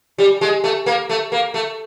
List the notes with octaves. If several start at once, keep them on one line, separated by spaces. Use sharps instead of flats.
G3
G#3
A3
A#3
A3
A#3
A3